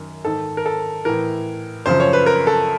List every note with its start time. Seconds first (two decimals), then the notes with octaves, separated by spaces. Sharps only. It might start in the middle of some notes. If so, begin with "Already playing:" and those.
Already playing: F#2 D#3
0.25 G#2 D#3 A4
0.57 A#4
0.66 A4
1.05 A2 E3 A#4
1.86 F#2 C#3 F3 C5
2.00 C#5
2.13 B4
2.26 A#4
2.47 A4